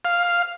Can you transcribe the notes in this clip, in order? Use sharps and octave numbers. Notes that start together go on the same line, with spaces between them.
F5